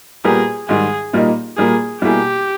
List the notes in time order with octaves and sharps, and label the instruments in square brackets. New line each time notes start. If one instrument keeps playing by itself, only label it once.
[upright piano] A#2 G3 B3 G4 A#4 [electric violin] G#4
[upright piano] G#2 D#3 G3 [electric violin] G#4
[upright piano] A#2 G3 A#3 D#4
[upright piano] A#2 G3 A#3 [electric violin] G#4
[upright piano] B2 G3 A#3 E4 G#4 [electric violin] G4